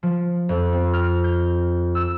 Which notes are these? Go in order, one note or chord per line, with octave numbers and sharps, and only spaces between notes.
F3
F2
C4
F6
G6
E6